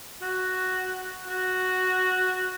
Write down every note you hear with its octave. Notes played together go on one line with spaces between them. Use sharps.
F#4
F#4